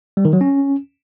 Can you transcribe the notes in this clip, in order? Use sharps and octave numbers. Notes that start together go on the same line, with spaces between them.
G3
D#3
F#3
C#4